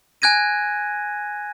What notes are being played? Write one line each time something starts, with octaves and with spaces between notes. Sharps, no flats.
G#5 F#6 G#6 A#6 D#7